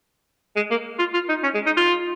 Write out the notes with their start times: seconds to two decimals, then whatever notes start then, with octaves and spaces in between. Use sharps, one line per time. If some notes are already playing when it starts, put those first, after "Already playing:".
0.56 G#3
0.71 A#3
0.99 F4
1.14 F4
1.29 D#4
1.43 C#4
1.54 G#3
1.66 D#4
1.77 F4